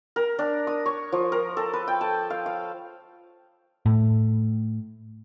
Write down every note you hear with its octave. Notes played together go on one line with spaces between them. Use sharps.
A#4
D4
D#6
C#5
F3
A#4
A4
B4
G5
A5
F5
F5
A2